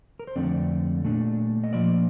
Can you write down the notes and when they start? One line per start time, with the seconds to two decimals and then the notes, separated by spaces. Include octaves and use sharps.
0.19 A#4
0.27 C5
0.36 F2 D3 A3 C4 D5
1.04 A#2 A3 D4
1.64 D#5
1.73 A#2 F3 A#3 D5